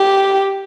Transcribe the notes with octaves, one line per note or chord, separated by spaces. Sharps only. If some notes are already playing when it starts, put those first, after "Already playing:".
Already playing: G4